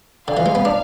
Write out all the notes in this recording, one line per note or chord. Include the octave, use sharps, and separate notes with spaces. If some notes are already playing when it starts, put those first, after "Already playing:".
D3 F5
E3
G#3
B3
D4